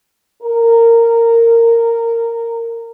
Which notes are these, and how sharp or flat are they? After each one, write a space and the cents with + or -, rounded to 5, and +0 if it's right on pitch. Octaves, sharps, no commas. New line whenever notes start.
A#4 -15